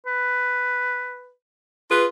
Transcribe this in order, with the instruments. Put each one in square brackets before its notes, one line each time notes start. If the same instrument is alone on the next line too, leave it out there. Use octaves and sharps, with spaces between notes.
[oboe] B4
[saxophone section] F4 G#4 B4